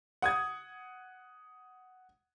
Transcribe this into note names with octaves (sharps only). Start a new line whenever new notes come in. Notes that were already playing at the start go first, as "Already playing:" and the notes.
F#5 D#6 G#6